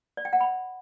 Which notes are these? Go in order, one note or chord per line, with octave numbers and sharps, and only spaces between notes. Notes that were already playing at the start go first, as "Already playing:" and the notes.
D5
G5
F#5
B5